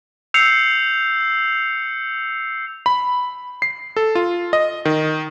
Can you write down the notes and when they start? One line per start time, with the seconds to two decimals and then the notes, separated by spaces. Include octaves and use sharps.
0.34 E6 G6 C7 C#7 F7
2.86 B5
3.62 C7
3.96 A4
4.15 F4
4.53 D#5
4.85 D#3